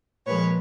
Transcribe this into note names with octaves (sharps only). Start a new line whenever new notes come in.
A#2 F3 G#3 B4 C#5